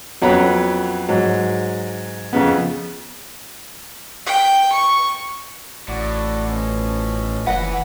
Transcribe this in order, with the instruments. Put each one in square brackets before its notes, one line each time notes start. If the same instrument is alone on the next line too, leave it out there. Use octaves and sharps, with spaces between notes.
[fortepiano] F2 F#3 B3 C#4 A#5 B5
G#2 F#3
F2 C#3 B3
[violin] G5
C#6
[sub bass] A1 [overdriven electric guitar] A2 [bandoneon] F#4 D5
[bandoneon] B2 F3 C#4
[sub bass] F#1 [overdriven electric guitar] E3 B4 [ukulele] D#5 F#5